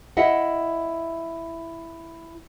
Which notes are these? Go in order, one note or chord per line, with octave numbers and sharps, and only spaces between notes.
E4 D#5 E5 F#5